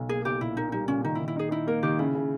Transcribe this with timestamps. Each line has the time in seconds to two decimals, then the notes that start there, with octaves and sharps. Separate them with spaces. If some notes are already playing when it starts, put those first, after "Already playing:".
Already playing: B1
0.09 A#3 G#4
0.25 B1 G4
0.41 A#2 E4
0.57 A#3 D#4
0.72 G3 D#4
0.88 A#2 C#4
1.04 D#3 D#4
1.15 E4
1.20 D#3
1.28 E4
1.36 D#4 G#4
1.51 D#4 E4
1.67 A#3 A#4
1.83 D#3 G4
1.99 C#3 E4
2.15 C#3